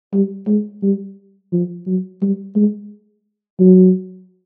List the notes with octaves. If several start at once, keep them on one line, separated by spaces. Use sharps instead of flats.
G3
G#3
G3
F3
F#3
G3
G#3
F#3